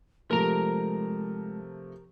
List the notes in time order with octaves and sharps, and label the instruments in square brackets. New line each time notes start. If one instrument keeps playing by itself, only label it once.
[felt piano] C3 F3 A3 [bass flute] G#3 [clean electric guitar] A#4 A#5